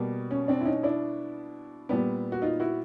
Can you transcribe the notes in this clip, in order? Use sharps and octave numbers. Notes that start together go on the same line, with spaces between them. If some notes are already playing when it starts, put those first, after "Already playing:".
Already playing: B2 G3 A#3
C#4
C4 D4
E4
C#4 D#4
D4 E4
A#2 G3 B3
F#4
D#4 F4
E4 F#4